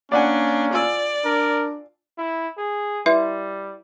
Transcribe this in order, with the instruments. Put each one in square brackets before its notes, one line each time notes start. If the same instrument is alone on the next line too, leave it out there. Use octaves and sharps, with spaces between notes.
[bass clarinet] A#3 [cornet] C#4 [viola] D4 [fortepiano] D5 F#5 G#5
[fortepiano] F4 G#5 E6 [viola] D5
[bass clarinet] D4 [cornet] A#4
[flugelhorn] E4
G#4
[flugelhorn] G3 [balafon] E4 B4 E5